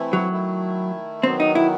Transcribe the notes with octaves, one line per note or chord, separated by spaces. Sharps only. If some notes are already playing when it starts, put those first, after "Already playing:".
Already playing: C3 E3 A3 E4
F#3
D#3 A3 E4
D#3 F#3 B3 C4
D#4
E4